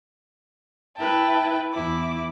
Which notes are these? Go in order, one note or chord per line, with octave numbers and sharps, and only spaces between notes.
E4 B4 G5 A5
E2 E4 D6